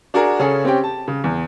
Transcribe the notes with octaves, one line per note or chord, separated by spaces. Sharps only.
D4 F#4 G#4 A#4
C#3 C#4 G#4 A4
C4 C#4 G4 G5
A5
C#3
E2